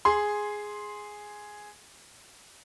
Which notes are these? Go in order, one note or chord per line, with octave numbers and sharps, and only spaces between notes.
G#4 C6